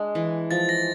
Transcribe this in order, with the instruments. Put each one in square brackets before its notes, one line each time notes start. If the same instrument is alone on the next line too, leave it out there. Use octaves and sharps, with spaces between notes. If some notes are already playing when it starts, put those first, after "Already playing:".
Already playing: [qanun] G#3 D4
E3
[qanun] F3 [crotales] A6
[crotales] A#6